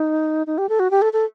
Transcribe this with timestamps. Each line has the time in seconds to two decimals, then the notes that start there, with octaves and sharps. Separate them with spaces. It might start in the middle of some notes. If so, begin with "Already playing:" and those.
Already playing: D#4
0.47 D#4
0.58 G4
0.69 A4
0.80 F#4
0.91 G4
1.02 A4
1.13 A4